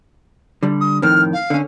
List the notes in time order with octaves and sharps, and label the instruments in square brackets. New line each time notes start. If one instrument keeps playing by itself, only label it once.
[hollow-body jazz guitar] D3 G3
[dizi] D#6
[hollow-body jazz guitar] F2 A2 D#3 [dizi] F6
[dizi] F5
[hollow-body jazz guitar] D3 C#4